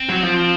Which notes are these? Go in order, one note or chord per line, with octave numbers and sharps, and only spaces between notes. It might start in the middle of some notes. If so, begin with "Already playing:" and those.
Already playing: C4
F#3
F3